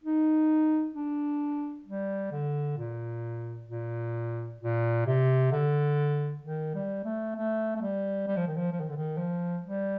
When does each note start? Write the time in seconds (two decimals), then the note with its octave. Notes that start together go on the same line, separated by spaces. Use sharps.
0.04 D#4
0.95 D4
1.86 G3
2.32 D3
2.78 A#2
3.69 A#2
4.61 A#2
5.07 C3
5.52 D3
6.43 D#3
6.75 G3
7.05 A3
7.36 A3
7.76 A3
7.81 G3
8.27 G3
8.37 F3
8.47 D#3
8.57 F3
8.73 F3
8.80 D#3
8.89 D3
8.97 D#3
9.18 F3
9.64 G3